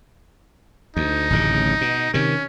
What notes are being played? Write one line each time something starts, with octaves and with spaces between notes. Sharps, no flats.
D2 D#4
D1 A1 C#3
B2
C3 D#3 C#4